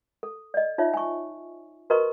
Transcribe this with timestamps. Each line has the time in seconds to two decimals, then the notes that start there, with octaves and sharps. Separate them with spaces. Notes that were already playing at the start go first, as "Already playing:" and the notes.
0.23 A4
0.54 D5 D#5
0.78 D#4 F4 C#5 E5
0.94 G#5 C#6
1.90 F#4 A#4 B4 D#5 A#5 C#6